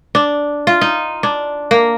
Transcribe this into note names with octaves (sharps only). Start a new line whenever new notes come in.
D4
F4
D#4
D4
A#3